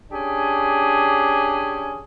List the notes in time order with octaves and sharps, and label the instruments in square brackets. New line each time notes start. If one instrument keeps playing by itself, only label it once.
[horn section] C#4 D4 G4 G#4